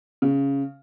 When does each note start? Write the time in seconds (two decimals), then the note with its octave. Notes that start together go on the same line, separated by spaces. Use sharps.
0.22 C#3